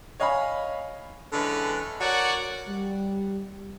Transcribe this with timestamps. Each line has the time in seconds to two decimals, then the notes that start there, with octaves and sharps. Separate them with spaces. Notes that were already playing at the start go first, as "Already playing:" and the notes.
0.20 C#5 D#5 F5 G#5 B5
1.33 D3 E3 G#3 C#4 B4
2.01 F#4 A#4 C#5 D5 F#5
2.69 G3